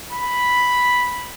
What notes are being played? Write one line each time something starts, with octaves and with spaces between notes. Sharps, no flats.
B5